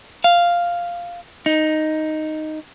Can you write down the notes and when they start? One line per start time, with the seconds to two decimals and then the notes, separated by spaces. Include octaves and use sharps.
0.24 F5
1.46 D#4